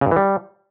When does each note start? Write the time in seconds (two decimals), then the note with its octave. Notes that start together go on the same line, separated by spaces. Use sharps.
0.01 C#3
0.06 G2
0.11 E3
0.16 G3